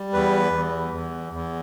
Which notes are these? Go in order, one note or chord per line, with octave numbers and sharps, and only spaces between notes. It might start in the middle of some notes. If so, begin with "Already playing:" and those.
Already playing: G3
E2 B4
E2
E2
E2